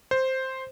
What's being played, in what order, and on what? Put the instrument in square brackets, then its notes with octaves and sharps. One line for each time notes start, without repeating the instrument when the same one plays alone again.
[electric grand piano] C5